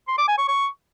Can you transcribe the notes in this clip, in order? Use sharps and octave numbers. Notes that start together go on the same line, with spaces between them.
C6
D6
G#5
C#6
C#6